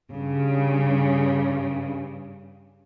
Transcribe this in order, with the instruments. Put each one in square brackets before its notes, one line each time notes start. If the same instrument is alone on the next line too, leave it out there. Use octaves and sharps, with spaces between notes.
[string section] G2 C#3